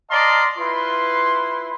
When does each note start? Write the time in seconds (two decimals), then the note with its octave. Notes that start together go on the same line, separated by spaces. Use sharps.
0.10 D5 D#5 F5 A5 A#5 C6
0.58 E4 F4 B4 C6